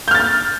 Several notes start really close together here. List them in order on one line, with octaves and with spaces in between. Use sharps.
G6 F6 A6